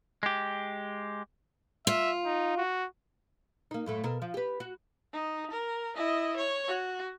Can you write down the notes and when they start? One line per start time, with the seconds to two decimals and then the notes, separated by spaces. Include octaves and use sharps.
0.23 G#3 G4
1.87 F4 E5
2.26 D#4
2.58 F#4
3.71 A#3 D#4
3.86 F#2 A2 A3
4.04 B2 A4 A#4
4.22 F3
4.34 G4 B4
4.60 F#4
5.13 D#4
5.51 A#4
5.95 E4 D#5
6.37 C#5
6.68 F#4